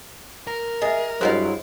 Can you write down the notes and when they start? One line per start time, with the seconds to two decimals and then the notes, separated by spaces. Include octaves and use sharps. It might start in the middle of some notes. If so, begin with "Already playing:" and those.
0.47 A#4
0.82 G#4 D#5 E5
1.21 G2 F#3 G#3 E4 C5 C#5 D#5 F5